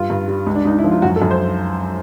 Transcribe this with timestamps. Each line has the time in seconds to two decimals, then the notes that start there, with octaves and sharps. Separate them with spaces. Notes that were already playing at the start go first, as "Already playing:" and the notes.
Already playing: G2 F4
0.10 G2
0.28 G3
0.47 C#2
0.55 D4
0.65 C#2 D#4
0.79 E4
0.84 F3
0.91 F4
1.02 F#2 F#4
1.16 A4
1.22 F#2
1.31 C5